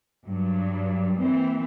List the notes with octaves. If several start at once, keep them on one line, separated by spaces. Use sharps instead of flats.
G2 F#3
E3 A#3 C4